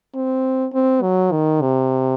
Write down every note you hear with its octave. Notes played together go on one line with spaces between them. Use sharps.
C4
C4
F#3
D#3
C3